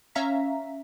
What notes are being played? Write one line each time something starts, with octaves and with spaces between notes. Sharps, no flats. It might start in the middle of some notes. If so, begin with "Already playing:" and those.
C#4 E5 F5 A#5 B6